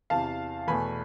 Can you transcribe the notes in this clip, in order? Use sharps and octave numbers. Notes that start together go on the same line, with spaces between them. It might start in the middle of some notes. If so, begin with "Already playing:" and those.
E2 C3 E3 F5 A5
E2 B2 A3 G#5 B5